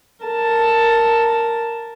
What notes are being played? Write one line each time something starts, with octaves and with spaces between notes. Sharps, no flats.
A#4 A5